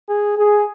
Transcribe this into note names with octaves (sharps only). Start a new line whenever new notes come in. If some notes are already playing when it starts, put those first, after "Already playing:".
G#4
G#4